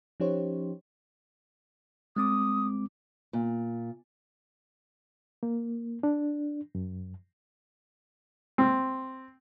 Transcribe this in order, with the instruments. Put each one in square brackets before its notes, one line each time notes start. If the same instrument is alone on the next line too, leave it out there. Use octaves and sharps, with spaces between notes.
[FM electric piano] F3 C#4 D#4 G4 C5 C#5
[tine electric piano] G#3 C4 D6 [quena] D#6
[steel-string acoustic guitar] A#2
[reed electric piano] A#3
D4
F#2
[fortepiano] C4